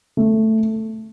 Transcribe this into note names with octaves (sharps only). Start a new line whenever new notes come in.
A3